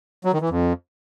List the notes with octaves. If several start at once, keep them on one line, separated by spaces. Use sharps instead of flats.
F#3
D#3
E3
F2